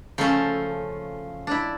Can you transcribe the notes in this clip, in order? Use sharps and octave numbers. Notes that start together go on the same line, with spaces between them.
C#3 F3 A3 C#4 A4
D4 E4